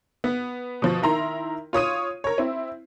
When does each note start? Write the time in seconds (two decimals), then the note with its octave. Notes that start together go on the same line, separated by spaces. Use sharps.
0.24 B3
0.82 B2 F3
1.02 D#3 E4 A#4 A#5 C6
1.73 F4 C#5 D#6 D#7
2.24 A#4 C#5
2.38 C4 E4